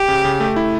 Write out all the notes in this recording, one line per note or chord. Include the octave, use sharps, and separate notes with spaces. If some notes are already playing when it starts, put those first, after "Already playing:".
Already playing: G4
C#3
C#3
A3
E4